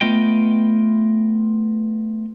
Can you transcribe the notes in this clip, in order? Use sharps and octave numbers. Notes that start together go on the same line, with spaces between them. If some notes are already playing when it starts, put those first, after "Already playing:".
A3 B3 F4 D#5 G5